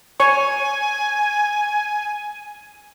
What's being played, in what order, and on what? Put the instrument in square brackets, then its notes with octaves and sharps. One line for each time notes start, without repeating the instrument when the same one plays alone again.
[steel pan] C#5 C#6 [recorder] G#5